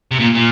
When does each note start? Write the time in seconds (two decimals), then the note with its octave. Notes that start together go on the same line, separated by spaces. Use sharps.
0.12 C3
0.20 A#2
0.35 A#2